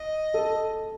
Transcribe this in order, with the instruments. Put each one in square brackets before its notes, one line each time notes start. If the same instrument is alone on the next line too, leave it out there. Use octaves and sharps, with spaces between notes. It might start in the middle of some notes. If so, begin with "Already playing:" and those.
Already playing: [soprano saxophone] D#5
[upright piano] A4